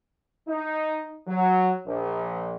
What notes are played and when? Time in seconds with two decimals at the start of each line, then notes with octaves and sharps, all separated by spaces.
0.48 D#4
1.27 F#3
1.86 A#1